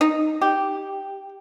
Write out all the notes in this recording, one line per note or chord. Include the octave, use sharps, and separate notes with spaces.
D#4
G4